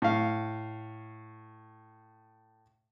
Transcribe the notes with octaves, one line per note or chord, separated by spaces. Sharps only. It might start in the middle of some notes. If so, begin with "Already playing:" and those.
A2 F5